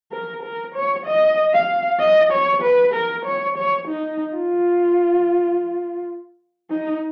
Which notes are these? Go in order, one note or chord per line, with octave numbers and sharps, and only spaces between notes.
A#4
A#4
C#5
D#5
F5
D#5
C#5
B4
A#4
C#5
C#5
D#4
F4
D#4